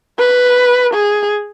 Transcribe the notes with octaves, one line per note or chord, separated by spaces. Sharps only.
B4
G#4